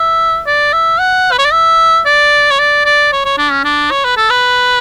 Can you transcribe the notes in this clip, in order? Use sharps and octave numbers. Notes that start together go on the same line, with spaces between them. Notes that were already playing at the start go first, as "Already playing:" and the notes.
Already playing: E5
D5
E5
F#5
B4
C#5
D5
E5
D5
C#5
D5
D5
C#5
C#5
D4
C#4
D4
C#5
B4
A4
B4